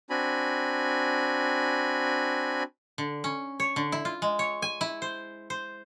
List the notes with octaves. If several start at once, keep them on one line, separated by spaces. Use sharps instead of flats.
C4 D4 F#4 G#5 B5
D3
C#4
C#5
D3
E4
F4
G#3
C#5
G#5
E4
C5
C5